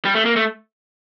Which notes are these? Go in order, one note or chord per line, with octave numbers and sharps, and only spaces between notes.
G3
A3
A#3
A3